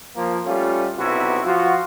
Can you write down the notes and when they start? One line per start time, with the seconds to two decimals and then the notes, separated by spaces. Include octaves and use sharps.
0.16 F3 A#3
0.46 G3 A3 C#4 F4
0.98 B1 C3 B3 E4 F#4
1.45 F3 F4 F#4